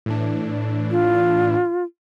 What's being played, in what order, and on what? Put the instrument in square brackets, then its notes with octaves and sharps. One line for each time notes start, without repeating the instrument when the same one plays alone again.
[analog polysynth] A2 E3 D4
[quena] F4